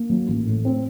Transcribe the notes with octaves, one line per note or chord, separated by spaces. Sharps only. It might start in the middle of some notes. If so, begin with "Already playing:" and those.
Already playing: A#3
F#3
A1
A2
C4